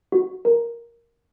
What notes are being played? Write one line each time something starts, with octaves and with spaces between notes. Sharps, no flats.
F#4
A#4